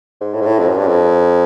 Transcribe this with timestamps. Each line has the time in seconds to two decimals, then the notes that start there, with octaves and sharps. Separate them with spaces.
0.21 G#2
0.34 A2
0.41 G#2
0.46 A2
0.59 F2
0.69 F#2
0.78 G2
0.88 F2